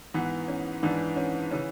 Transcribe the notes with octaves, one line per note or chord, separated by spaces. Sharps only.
G#2 E3 B3
C#4
G#2 E3 D4
C#4
C#3 E3 C#4